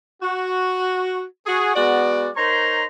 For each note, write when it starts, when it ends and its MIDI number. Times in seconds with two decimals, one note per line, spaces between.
0.23 1.22 66
1.47 1.75 66
1.47 1.75 68
1.76 2.29 56
1.76 2.29 59
1.76 2.29 66
1.76 2.29 74
2.37 2.85 63
2.37 2.85 70
2.37 2.85 72
2.37 2.85 73
2.37 2.85 82
2.37 2.85 84